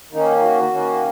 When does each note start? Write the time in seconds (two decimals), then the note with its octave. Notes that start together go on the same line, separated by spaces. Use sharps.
0.12 D#3 A#3 C#4 D#4
0.43 F#4
0.71 D#3 A#3 C#4